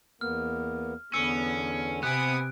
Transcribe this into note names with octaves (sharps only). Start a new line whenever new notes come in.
E2 A#3 B3 F6
E2 D3 B3 C#4 E6 C#7
C3 B3 G#5 D#6 F#6 D7